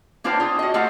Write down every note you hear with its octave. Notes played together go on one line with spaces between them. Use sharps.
A#3 D4 F4 B4 C5 G5
F4 G#4
F#4 D#5
A3 A#3 F4 G4 D#5 F#5